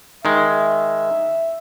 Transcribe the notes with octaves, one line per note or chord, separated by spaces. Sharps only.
D#3 G#3 E5